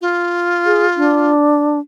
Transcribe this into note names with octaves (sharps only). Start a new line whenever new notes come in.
F4
G#4
D4